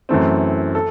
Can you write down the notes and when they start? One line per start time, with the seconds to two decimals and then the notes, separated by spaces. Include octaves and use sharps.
0.09 F#2 E3 A3 C4
0.75 A4